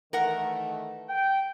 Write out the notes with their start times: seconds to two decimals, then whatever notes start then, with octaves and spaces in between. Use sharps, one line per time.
0.13 D#3 E3 A3 A#4 F#5
1.09 G5